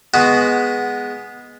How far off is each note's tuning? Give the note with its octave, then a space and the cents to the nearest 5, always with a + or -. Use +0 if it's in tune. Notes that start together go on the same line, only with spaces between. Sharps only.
G#3 +0 B3 +0 F#4 +0